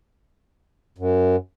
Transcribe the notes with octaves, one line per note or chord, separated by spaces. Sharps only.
F#2